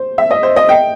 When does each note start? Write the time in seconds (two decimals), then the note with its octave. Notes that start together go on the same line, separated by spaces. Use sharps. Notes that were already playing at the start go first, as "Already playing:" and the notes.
Already playing: C5
0.18 E5
0.31 D#5
0.43 C5
0.56 D#5
0.69 G5